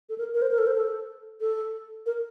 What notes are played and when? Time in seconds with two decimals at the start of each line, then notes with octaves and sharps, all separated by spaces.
0.09 A4
0.18 A#4
0.34 A#4
0.42 C5
0.51 A#4
0.58 A4
0.67 C5
0.75 A4
1.41 A4
2.06 A#4